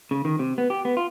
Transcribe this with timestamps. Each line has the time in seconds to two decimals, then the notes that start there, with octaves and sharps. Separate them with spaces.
0.11 C#3
0.25 D#3
0.39 C3
0.58 B3
0.70 G4
0.85 B3
0.97 F4